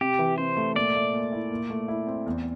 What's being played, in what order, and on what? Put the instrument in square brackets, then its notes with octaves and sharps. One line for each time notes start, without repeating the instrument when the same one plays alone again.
[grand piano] C3 [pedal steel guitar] G4
[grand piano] E3
[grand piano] C3 [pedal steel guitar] C5
[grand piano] A3
[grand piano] A#2 [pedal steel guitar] D5
[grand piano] A3
A#2
E4
A#2
A3
E4
C4
E2